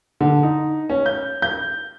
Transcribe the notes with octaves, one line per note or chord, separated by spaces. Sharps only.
D3
D#4
C#4
G6
G6